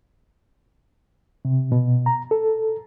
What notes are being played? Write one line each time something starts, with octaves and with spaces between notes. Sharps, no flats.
C3
B2
A#5
A4